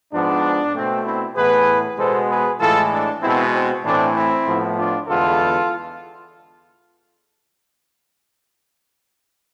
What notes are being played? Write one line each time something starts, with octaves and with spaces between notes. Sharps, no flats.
G#2 F3 B3 D4
B2 A3 C4
C4 E4
A2 E3 B3 G#4 B4
B2 G#3 B3 A4 C5
G#4 B4
A2 E3 G#3 F4 A4
D4
B2 G#3 B3 C4 E4
C4
A2 E3 A3 C4 D4
C4 E4
A2 F3 B3
D4 F4
E2 D3 G#3 B3 F4 A4